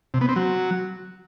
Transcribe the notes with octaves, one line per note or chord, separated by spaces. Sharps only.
C3
B3
C4
F#3